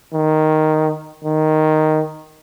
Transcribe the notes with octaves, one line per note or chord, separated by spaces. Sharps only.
D#3
D#3